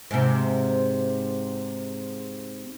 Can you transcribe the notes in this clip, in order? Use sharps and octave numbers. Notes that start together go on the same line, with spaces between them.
G#2 C3